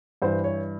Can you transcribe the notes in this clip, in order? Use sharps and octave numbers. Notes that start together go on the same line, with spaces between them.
G2 E3 C5
C#5